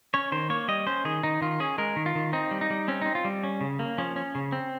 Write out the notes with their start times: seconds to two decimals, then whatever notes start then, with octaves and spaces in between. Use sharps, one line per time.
0.14 C#4 C#5
0.32 D#3 C5
0.50 A#3 C#5
0.68 G3 D#5
0.87 C#4 C5
1.05 D#3 G#4
1.23 D#3 D#4
1.41 D#3 F4
1.60 C#4 G#4
1.78 G#3 A#4
1.96 D#3
2.06 F4
2.15 D#3
2.33 C4 D#4
2.51 G3
2.61 D#4
2.70 G3
2.88 C4 C#4
3.02 C4 D#4
3.15 F4
3.25 G3
3.44 C#4
3.61 C#3
3.79 A#3
3.98 F3 C#4
4.16 C#4
4.35 C#3
4.52 C4